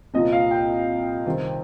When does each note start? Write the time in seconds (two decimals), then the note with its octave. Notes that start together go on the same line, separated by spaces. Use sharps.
0.14 C2 A#2 F3 D#5
0.32 F5
0.51 G5
1.26 C2 C3 D#3